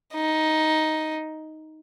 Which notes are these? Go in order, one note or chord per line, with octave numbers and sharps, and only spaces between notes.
D#4